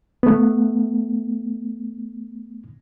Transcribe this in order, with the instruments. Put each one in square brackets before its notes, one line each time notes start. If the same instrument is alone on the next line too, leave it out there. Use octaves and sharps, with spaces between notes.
[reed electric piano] A3 B3